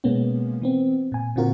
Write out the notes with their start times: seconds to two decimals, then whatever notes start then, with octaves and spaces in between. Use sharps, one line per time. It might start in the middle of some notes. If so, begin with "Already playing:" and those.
0.04 B2 G#3 A#3 B3 C#4
0.62 E3 B3 C4
1.12 A#2 G#5
1.36 A#2 D3 C4 F4 F#4 A#4